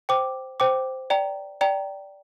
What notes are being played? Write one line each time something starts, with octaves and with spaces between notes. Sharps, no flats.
C5 G5 D6
C5 G5 D6
D5 G5 A#5
D5 G5 A#5